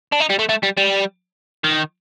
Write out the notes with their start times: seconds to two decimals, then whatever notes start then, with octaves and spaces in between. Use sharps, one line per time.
0.12 D4
0.20 D#4
0.30 G3
0.39 A3
0.49 A3
0.63 G3
0.77 G3
1.64 D#3